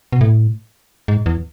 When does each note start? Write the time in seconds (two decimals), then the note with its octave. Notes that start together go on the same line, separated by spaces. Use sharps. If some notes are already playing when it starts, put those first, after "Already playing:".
0.12 B2
0.21 A2
1.08 G#2
1.26 E2